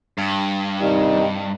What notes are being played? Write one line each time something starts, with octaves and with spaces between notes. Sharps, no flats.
G2
C3 D#3 G3 D#4